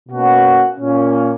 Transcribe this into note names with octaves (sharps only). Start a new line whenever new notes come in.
B2 A#3 C#4 F#4
A#2 A#3 C#4